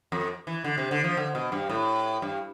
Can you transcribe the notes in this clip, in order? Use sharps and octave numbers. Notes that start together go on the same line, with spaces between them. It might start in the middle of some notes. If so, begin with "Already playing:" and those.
F2
E3
D3
C3
D3
F3
D3
B2
G2
A2
G2